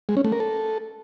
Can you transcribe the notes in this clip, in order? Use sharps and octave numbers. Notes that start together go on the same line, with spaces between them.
G#3
C#4
A3
A#4
A4